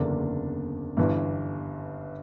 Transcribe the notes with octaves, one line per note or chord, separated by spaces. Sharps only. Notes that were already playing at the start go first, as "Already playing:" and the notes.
Already playing: F#1 E2 D3 A#3 D4
G1 G2 E3